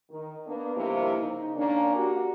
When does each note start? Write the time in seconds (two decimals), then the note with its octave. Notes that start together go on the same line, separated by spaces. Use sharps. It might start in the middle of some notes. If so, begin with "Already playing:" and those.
0.11 D#3
0.47 A#3 B3 D4
0.75 G2 C3 D#3 F3 A#3 E4
1.20 C#3 D#4
1.56 D#3 A#3 C#4 D4
1.95 F#4 G4 A#4